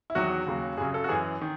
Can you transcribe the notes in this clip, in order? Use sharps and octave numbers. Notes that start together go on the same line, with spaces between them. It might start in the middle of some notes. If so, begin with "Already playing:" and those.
E4
E2 D#3 F#3 F#4
D#2 C#3 F#3
F#2 C#3 F#3 G#4
A4
F#4
F#2 E3 G#4
D#3